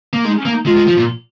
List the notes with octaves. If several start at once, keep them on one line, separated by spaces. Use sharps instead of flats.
A#3
G#3 D#4
C#4
A#3
D#4
G#3 F4
G#3
F3
A#2